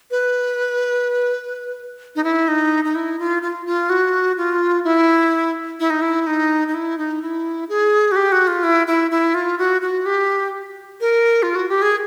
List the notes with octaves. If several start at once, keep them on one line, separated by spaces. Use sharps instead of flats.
B4
D#4
E4
D#4
D#4
E4
F4
F4
F4
F#4
F4
E4
E4
D#4
E4
D#4
D#4
E4
D#4
E4
G#4
F#4
G4
F#4
F4
E4
E4
E4
F4
F#4
F#4
G4
A#4
F4
F#4
G4
G#4